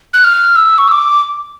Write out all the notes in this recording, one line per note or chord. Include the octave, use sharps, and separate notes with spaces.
F#6
F6
E6
C#6
E6
D6